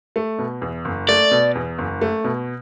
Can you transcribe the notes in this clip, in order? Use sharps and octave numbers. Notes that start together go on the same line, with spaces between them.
A3
B2
E2
F#1
A3 D5
B2
E2
F#1
A3
B2